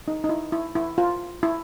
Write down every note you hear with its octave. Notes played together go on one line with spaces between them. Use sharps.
D#4
D#4
E4
E4
E4
F4
E4